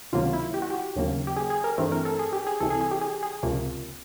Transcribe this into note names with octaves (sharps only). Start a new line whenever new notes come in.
C#2 C3 D#3 F#3 A#3 F4
E4
G4
F#4
G4
D#2 C#3 F#3 A#3
G4
G#4
G#4
A#4
G2 E3 A3 C4
A#4
A4
G#4
G4
G#4
C2 C3 E3 A4
G#4
G#4
G4
G#4
G#4
C#2 C3 F3 A#3